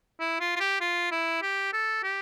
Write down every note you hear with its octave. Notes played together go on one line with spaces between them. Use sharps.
E4
F4
F4
G4
F4
E4
G4
A4
G4